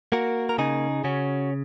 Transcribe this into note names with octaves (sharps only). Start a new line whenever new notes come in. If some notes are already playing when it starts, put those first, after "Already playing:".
A#3 F#4 A#4
A#4
C#3 D#4 G#4
C#3 C#4 F#4